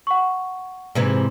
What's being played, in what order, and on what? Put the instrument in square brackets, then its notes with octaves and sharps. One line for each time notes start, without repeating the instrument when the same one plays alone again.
[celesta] F#5 C#6
[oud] G#2 C3 E3